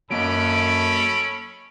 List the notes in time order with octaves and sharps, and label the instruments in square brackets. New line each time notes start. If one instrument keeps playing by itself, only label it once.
[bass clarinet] F#2 [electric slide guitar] F#3 A#3 D#5 [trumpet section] C#4 A4 B5 [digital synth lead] D7